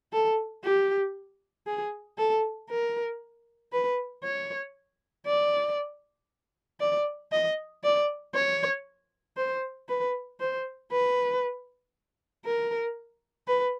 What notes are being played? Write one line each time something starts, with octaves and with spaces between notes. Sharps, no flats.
A4
G4
G#4
A4
A#4
B4
C#5
D5
D5
D#5
D5
C#5
C5
B4
C5
B4
A#4
B4